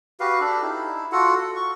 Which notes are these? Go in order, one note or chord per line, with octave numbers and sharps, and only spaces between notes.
F#4 G4 B4 F5
D4 G4 A4
D#4 E4
F4 F#4 A4 F#5
A4
C#6